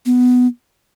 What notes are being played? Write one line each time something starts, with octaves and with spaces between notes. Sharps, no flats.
B3